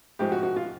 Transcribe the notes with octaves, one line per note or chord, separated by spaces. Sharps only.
A1 G#2 F3 G4
F#4
F#4
F4